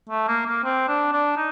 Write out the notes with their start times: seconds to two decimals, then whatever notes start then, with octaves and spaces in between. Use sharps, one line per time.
0.09 A3
0.28 A#3
0.46 A#3
0.64 C4
0.88 D4
1.12 D4
1.37 D#4